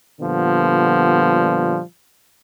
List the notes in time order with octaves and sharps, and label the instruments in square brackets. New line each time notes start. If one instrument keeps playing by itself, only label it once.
[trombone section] A#2 D3 F3 G3 B3